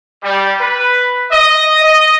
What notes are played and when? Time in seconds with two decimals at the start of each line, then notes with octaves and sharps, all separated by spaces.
0.23 G3
0.60 B4
1.31 D#5
1.82 D#5